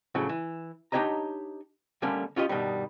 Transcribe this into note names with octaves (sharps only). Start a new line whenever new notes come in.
A2 C#3 F3 F#3
E3
D4 D#4 G4 C#5 D#5 A#5
D3 G3 A3 A#3 C#4
C#4 F4 G4 D#5
G2 B2 D#3 G3